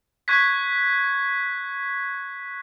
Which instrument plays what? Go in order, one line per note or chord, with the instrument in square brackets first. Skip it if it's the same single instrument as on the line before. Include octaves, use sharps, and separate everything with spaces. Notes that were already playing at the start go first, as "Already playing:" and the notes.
[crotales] C#6 F#6 G#6 B6